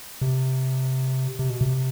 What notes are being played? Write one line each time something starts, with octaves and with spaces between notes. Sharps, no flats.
C3
C3
B2
C3